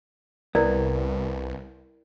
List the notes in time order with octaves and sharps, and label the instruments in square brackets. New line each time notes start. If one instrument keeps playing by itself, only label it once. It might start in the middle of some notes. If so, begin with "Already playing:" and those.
[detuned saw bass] C2 [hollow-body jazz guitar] B3 [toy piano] E4 A#4 D5